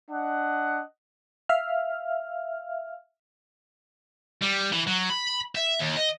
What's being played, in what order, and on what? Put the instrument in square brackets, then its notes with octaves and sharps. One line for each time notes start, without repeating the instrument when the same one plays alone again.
[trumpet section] D4 D#5 F#5
[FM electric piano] E5 F5 F6
[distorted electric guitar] G3
E3
F#3
B5
E5
D#2
D#5